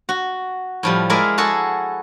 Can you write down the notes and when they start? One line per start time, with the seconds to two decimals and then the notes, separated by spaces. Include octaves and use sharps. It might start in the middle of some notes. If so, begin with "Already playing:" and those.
0.09 F#4
0.83 A2 F3 G3
1.10 G#3 E4 A#4 D5 E5
1.38 F#4 G#4 A4